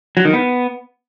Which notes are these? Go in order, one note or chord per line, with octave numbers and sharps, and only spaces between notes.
F#3
D#3
B3